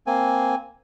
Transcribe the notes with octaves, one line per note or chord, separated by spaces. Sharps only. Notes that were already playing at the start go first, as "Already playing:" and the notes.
A#3 C4 G#5